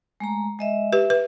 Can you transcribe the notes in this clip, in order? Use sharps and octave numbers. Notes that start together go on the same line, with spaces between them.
G#3 A3 A#5
G#3 D#5 E5
G4 B4 E5
B4